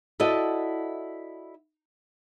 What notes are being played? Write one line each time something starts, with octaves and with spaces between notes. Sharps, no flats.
E4 F#4 A4 D5 D#5